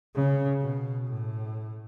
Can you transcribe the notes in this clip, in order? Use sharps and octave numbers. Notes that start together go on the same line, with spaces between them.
C#3
B2
A2